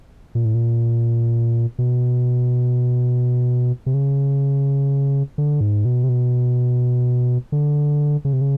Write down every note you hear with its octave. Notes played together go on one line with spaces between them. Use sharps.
A#2
A2
A#2
B2
C3
C#3
D3
G#2
B2
C3
B2
D3
C#3
C3
C#3